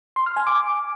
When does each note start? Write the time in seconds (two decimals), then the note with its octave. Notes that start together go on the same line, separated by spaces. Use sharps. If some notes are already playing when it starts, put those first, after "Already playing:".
0.16 C6
0.26 F6
0.36 G#5
0.47 D6